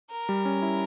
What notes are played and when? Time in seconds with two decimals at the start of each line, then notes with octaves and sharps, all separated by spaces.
0.11 A#4
0.29 G3
0.45 C#4
0.62 E4